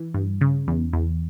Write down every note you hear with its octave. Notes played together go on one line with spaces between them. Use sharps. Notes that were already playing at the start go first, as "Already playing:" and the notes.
Already playing: E3
G2
C#3
E2
E2